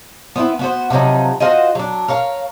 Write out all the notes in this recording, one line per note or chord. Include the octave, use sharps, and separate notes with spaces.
B3 C4 D#4 E4
B3 F#4 C5
C3 F3 F#3 D#4
F4 F#4 C5 D#5
F#3 D4
A#4 C#5 F5